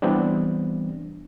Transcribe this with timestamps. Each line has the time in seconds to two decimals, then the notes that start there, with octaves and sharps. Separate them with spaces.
0.02 E3 G3 B3 C4 D4